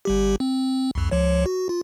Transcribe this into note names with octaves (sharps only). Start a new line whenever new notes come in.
G1 G3 G4
C4
C2 F2
C#2 F3 C#5
F#4
F4